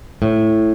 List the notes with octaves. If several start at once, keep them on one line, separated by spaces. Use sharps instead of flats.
A2